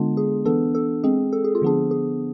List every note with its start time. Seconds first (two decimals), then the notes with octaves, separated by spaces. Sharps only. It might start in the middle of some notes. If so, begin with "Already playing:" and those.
Already playing: D3 G#3 B3 D4 F4
0.17 G#4
0.45 E3 B3 D4 A4
0.75 A4
1.04 G#3 C4 G#4
1.33 A4
1.44 G#4
1.55 F4
1.62 D3 F3 B3 D4 G#4
1.91 G#4